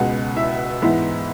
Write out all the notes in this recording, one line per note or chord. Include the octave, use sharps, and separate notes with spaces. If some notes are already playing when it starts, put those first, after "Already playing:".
Already playing: C#2 B2 G#3 F#4 F#5
E4 E5
G#2 E3 G#3 B3 E4 E5